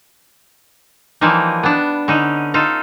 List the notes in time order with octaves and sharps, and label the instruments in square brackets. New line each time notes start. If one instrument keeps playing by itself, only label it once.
[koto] E3 F3 G3 A#3 D#4
B3 D4
D3 C#4 D#4
D#4 F4 A4